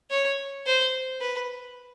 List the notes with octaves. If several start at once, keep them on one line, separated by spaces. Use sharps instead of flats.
C#5
C5
B4